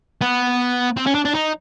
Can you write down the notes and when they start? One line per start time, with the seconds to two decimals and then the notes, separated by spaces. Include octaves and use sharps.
0.21 B3
0.96 C4
1.06 C#4
1.15 D4
1.25 D4
1.35 D#4